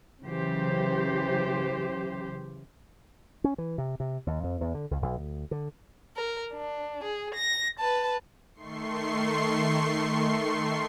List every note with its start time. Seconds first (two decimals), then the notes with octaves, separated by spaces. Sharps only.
0.23 C#3 E3 F#3 G4 C5
3.44 C#4
3.58 E3
3.78 C3
4.00 C3
4.27 D#2
4.43 F2
4.61 E2
4.75 D3
4.91 C#2
5.02 B1
5.18 D2
5.51 D3
6.16 A#4
6.53 D4
7.03 G#4
7.34 A#6
7.79 B4 A5
8.54 D#3 A3 C6 C#6 C7